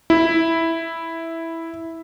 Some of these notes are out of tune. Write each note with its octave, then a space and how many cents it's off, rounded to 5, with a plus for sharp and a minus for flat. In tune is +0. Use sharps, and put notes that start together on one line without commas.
E4 -5